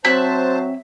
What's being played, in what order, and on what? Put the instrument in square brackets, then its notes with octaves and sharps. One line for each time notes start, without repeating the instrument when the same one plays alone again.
[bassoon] F#3 [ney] C4 [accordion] C5 A5 [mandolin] E5 F#6